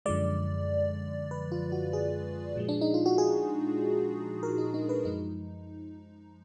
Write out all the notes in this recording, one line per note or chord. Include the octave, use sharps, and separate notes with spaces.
F#2 D3 F3 G#3 D5
B4
F4
F#4
G#4
A#2 F3 G#3
D4
D#4
F4
F#4
G#4
A#4
D#4
D#4
B4
F#2 F3 G#3 D#4